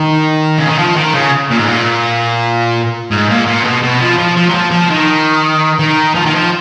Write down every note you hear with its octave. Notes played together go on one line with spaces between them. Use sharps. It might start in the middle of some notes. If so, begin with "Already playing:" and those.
Already playing: D#3
C#3
D#3
F3
D#3
C#3
A#2
G#2
A#2
G#2
A#2
A#2
B2
B2
F3
F3
F3
F#3
F3
F3
D#3
D#3
F3
D#3
F3